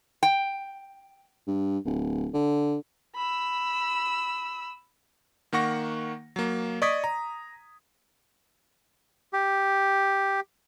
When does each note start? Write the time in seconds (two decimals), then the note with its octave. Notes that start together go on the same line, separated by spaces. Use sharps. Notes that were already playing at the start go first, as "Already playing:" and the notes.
0.23 G5
1.47 G2
1.85 D1
2.34 D3
3.16 B5 E6
5.53 D#3 A#3 F#5 C#6 A#6
6.36 F#3 A#3
6.82 D5 D#5 C#6 D#6 G#6 B6
7.04 A#5
9.33 G4